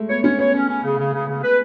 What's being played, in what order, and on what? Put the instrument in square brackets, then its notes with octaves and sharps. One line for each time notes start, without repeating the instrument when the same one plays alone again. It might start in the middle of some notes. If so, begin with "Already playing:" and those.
Already playing: [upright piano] G#3 A3
[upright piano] B3 [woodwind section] C#5
[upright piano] C#4 [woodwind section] C#5
[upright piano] B3 [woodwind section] C#5
[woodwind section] C#4
C#4
C#3
C#3
C#3
C#3
B4